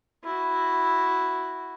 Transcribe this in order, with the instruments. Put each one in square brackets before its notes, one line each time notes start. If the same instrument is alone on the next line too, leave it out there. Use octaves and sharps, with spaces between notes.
[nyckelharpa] E4 F#4